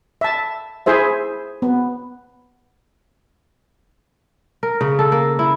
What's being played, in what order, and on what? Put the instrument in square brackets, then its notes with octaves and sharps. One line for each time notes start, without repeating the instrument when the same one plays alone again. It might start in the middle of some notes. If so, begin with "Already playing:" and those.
[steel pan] E5 A5
E4 G#4 C5 E5
B3
[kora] A#4
C#3
A4
A#3
E4